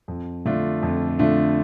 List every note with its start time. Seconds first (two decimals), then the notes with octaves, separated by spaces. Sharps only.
0.08 F2
0.45 D3 A3 D4 F4
0.83 F2
1.19 D3 A3 D4 F4